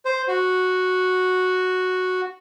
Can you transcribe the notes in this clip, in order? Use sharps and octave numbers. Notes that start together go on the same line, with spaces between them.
C5
F#4